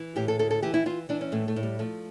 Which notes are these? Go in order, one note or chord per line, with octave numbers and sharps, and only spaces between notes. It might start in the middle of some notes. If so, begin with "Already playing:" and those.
Already playing: E3
A2 G4
A4
D2 A4
A4
E3 G4
E4
E3 F4
E3 D4
C#4
A2 A3
A3
A2
G3
F3 A3